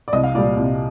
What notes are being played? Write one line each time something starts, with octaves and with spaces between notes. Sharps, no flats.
D5
C2 D#5
F5
A#2 G3 D5
C2